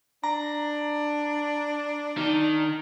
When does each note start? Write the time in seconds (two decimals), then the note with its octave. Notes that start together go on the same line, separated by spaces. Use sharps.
0.24 D4 A#5
2.18 D#3